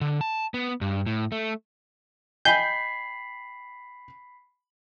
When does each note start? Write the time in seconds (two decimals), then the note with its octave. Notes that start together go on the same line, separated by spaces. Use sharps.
0.01 D3
0.21 A5
0.54 B3
0.81 G2
1.06 A2
1.32 A3
2.45 D#5 G5 G#5 B5 G6 B6 C7